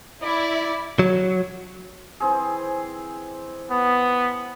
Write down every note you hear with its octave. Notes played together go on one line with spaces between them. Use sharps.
E4 D5
F#3
E3 C4 G#4
B3